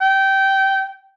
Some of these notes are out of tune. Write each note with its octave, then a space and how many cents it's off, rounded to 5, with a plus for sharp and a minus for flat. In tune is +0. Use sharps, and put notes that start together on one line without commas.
G5 -20